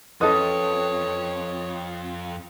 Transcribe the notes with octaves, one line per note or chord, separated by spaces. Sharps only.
F2 C#4 A4 B4 C#5 D#5 D#6